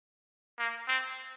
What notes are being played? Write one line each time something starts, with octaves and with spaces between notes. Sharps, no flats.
A#3
C4